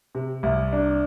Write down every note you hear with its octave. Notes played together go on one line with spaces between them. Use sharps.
C3
C2
D4